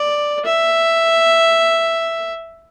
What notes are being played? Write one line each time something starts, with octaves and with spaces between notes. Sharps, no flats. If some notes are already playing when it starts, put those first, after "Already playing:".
Already playing: D5
E5